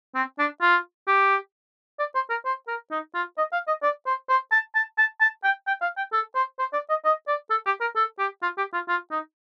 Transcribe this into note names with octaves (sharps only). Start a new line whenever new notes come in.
C4
D4
F4
G4
D5
C5
A#4
C5
A#4
D#4
F4
D#5
F5
D#5
D5
C5
C5
A5
A5
A5
A5
G5
G5
F5
G5
A4
C5
C5
D5
D#5
D#5
D5
A4
G4
A#4
A4
G4
F4
G4
F4
F4
D#4